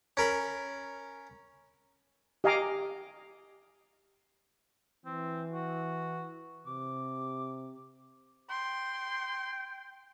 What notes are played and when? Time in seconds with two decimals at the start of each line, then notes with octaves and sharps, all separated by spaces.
0.17 C#4 A#4 B5
2.44 G4 D#5 F5 G#5 A#5 D6
5.06 E3 C4
5.52 F#4
6.67 C3 D6
8.50 G5 C6